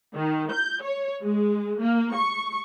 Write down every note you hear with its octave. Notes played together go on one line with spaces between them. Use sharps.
D#3
G6
C#5
G#3
A#3
C#6